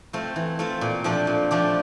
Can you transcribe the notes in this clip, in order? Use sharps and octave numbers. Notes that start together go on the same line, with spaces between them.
A3 C4 F4
E3
A3 C4 F4
A#2
F3 A3 D4 G4
A#2
F3 A3 D4 G4